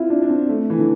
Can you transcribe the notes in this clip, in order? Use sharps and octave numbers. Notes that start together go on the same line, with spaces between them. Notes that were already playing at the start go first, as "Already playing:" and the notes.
Already playing: C4 E4 F4
D4
D4
C4
A3
E3
D3